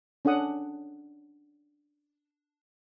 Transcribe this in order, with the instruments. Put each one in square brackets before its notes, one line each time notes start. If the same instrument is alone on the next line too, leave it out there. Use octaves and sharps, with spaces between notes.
[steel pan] C#4 D4 A4 F#5 D#6